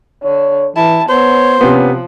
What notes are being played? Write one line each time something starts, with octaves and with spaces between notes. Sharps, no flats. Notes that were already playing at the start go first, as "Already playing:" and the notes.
D3 C#5
E3 E4 A5
B3 C5 C#5
C3 F3 B3 C#4